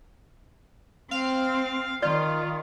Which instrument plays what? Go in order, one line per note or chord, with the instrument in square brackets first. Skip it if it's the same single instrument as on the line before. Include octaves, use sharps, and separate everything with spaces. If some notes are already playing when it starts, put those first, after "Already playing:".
[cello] C4 [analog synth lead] F5
[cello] D#3 [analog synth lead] F4 [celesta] D5